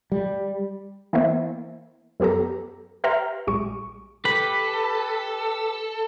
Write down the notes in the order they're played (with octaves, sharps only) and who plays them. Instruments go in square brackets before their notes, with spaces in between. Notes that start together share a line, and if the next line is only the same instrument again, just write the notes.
[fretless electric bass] G3
[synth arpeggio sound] E3 A#3 B3 E4 C5
F#2 B3 G4 A4 A#5
G4 B4 E5 A#5 C6 F6
A#1 G3 G#3 C#6
[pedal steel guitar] G4 B4 B5 [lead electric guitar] A4